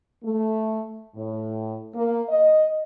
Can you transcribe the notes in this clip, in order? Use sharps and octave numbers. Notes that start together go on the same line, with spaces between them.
A3
A2
A#3
D#5